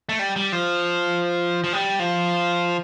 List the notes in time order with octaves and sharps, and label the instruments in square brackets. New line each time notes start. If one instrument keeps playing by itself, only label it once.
[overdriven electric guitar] A3
G3
G3
F3
F3
G3
F3